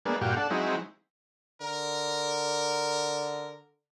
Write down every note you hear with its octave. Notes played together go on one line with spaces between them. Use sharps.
G#3 A#3 B3 D4
G2 A#2 F#4 G4 F5
D4 A4 F#5
F#3 G#3 C4 D#4 E4
D3 A#4